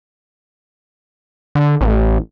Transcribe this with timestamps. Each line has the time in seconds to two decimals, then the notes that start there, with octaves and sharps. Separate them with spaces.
1.55 D3
1.81 A1